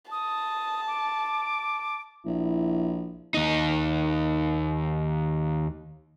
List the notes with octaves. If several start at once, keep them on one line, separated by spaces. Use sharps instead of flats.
A5 D#6
D6
A#1 E4
D#2 D#4